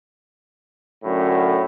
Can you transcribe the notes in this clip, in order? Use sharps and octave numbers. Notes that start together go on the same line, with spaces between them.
F#2 A2 D3